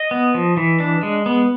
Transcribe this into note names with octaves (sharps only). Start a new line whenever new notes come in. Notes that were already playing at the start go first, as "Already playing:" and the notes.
Already playing: D#5
B3
F3
E3
D4
G#3
B3